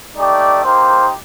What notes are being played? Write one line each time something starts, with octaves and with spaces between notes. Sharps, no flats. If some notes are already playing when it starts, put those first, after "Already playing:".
A3 D#4 G4 D5
A#3 D#4 G4 C5